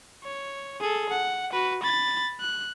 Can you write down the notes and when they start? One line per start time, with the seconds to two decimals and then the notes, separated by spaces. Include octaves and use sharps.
0.24 C#5
0.80 G#4 A4
1.10 F#5
1.53 F#4 B4
1.83 B5 A6
2.41 F#6